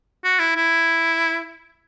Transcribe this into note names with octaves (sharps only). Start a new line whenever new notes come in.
F#4
E4
E4